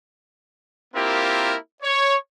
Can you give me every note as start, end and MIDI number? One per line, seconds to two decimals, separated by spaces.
0.94 1.55 58
0.94 1.55 60
0.94 1.55 64
0.94 1.55 65
0.94 1.55 67
0.94 1.55 70
1.82 2.16 73